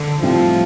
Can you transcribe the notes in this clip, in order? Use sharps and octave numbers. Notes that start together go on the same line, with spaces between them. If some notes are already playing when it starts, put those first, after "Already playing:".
Already playing: D3
A2 F3 G3 C4